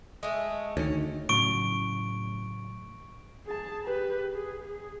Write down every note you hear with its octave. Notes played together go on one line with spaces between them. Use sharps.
G#3 A3
D2 D#3 C#4
A2 C#3 F#3 C#6 D7
G#4 A5
G4 B4
G#4
G#4